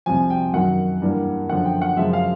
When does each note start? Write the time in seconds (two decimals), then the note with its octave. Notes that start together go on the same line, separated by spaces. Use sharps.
0.06 C2 C3 F3 G#5
0.30 G5
0.54 F#2 D#3 F#3 F#5
1.02 G2 E3 G3 A#3
1.49 F#2 D3 F3 F#5
1.65 G5
1.82 F#5
1.97 F#2 C#3 F3 G#3 E5
2.13 F5